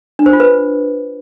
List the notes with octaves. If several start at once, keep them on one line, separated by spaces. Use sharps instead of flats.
D4
C5
F4
B4